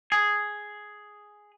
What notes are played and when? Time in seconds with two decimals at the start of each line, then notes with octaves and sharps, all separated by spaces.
0.12 G#4